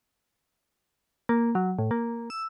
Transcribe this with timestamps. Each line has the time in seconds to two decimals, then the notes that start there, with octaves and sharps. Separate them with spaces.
1.29 A#3
1.55 F#3
1.79 A2
1.91 A#3
2.30 E6